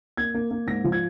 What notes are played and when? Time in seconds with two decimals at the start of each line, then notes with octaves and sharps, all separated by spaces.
0.17 A#3 G#6
0.34 A#3
0.51 A#3
0.67 G#2 A#6
0.84 F3
0.92 G#6